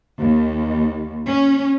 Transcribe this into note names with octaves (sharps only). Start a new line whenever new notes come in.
D#2
C#4